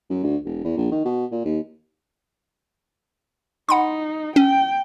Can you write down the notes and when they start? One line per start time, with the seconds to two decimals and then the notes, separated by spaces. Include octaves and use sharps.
0.10 F#2
0.23 D2
0.45 E1
0.64 E2
0.77 A#1
0.91 D#3
1.05 B2
1.32 A#2
1.44 D#2
3.69 D#4 F#5 B5 C6
4.36 C#4 G5